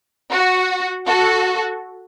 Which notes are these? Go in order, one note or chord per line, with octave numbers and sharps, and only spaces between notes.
F#4
F#4 A4